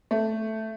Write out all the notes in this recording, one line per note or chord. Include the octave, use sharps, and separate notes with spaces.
A3